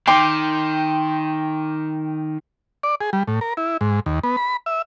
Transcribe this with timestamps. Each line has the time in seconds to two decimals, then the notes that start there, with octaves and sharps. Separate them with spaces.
0.07 D#3 G5 C6 D6
2.83 D5
3.01 G#4
3.13 G3
3.27 A2
3.41 A#4
3.57 E4
3.81 G#2
4.06 D#2
4.23 B3
4.37 B5
4.66 E5